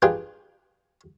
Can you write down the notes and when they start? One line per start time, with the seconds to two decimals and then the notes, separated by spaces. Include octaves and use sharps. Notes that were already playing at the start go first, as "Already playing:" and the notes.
0.02 D4 F4 G4 G#4 B4